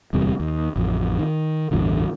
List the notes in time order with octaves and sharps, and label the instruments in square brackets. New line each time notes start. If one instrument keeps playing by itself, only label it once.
[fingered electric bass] D1 E2 C3 G3
D#2
A1 F2
D#3
A1 E2 G2 D3